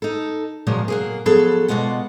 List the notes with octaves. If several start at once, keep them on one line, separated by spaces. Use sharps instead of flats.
D#4 A4
A#2 C#3 F3 F#3 G#3
F#3 A#3 G#4
F3 F#3 B3 G#4 A4
B2 G3 G#3 F4 F#5